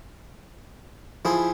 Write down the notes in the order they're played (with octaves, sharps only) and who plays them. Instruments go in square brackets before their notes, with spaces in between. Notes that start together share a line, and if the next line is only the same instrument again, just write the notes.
[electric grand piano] F3 [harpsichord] E4 G#4 C6